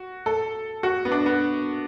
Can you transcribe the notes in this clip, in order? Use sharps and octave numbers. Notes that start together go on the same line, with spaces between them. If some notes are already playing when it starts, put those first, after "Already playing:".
Already playing: F#4
A4
F#4
B3
D4
B3